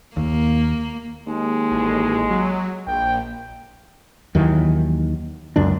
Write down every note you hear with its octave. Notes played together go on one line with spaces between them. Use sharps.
D#2 A#3
D#2 G#3
A1
F#3
A#1 G5
D#2 D#3 E3 F#3
C#2 F#2 D4